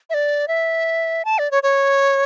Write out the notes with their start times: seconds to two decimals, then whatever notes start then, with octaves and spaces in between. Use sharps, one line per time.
0.10 E5
0.14 D5
0.48 E5
1.25 A5
1.39 D5
1.51 C#5
1.63 C#5